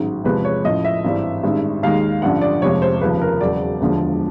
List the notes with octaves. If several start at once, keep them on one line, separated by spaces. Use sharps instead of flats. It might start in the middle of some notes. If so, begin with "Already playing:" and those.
Already playing: A1 G#2 D#3 F#3
E2 C3 F3 G#3 B4
C#5
A1 A2 F3 D#5
E5
G#1 G2 E3 G3
A1 G2 D#3 G#3
D#2 D#3 G#3 F5
A1 G2 D3 F3 F#5
D5
F1 F2 C3 F3 G#3 C#5
C5
F1 D#2 C#3 F3 B4
A#4
E1 E2 C#3 F#3 D5
E1 D2 D3 F3 G#3